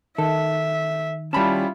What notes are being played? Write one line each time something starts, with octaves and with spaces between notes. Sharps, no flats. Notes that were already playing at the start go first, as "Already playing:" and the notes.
D#3 A4 E5
G3 C#4 E4 F4 A5 B5